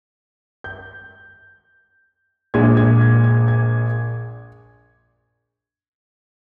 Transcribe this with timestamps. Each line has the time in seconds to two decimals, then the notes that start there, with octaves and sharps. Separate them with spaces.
0.64 G6
2.54 A#1 A#2 G#3 D4 G#6
2.77 G#6
3.01 G#6
3.24 G#6
3.48 G#6